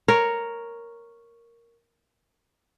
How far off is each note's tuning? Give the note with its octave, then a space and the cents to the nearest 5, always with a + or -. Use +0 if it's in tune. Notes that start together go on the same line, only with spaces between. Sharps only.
A#4 +0 C#5 +0